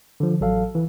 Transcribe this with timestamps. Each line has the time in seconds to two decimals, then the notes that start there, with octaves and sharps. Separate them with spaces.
0.20 D3 F3
0.40 A1 F#3 A4 F5
0.75 E3